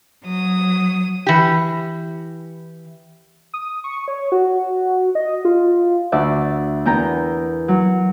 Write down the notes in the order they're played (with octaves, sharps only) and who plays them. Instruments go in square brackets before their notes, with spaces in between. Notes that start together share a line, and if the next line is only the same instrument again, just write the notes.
[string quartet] F#3 D#6
[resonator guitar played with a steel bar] E3 G4
[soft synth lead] D#6
C#6
C#5
F#4
D#5
F4
[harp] D2 D5 E5 F#5
E2 B3 A#4 G5 A#5
F#3